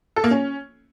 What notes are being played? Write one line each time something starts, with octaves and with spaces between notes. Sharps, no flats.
A4
A#3
C#4